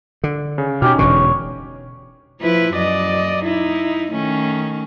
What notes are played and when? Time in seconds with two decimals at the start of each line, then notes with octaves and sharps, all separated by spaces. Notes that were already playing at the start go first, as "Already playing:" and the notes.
0.24 D3
0.58 C#3
0.82 B2 C#4 D#4 G4 F6
0.99 E1 B2 D3 C#5
2.41 F3 E4 B4
2.74 F#2 D5 D#5
3.44 D#4 E4
4.12 D#3 A3 C#4